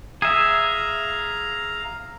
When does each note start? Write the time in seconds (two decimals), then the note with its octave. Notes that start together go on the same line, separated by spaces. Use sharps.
0.22 G#4 E5 F5 A#5